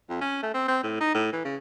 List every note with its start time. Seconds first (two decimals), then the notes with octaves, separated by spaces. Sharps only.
0.09 F2
0.21 C#4
0.43 A3
0.54 C4
0.68 C4
0.83 A2
1.01 D#4
1.14 A2
1.33 E3
1.45 C#3